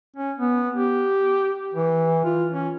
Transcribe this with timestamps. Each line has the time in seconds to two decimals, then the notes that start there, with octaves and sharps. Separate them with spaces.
0.16 C#4
0.38 B3
0.75 G4
1.74 E3
2.24 F4
2.52 C#4